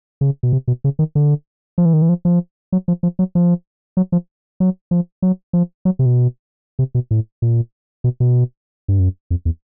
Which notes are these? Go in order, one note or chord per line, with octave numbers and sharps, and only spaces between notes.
C#3
B2
C3
B2
C#3
D#3
D3
F3
E3
D#3
E3
F3
F3
F#3
F3
F3
F#3
F3
F#3
F3
F#3
F3
F#3
F3
F#3
C3
B2
C3
B2
A2
A#2
B2
B2
G2
F#2
F2
E2